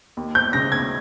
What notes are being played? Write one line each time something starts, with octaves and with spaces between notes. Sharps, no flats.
D#2
G6
C#3 A#6
G#6